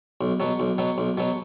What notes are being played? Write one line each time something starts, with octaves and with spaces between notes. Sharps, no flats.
B1
B2 F#3
B1
B2 F#3
B1
B2 F#3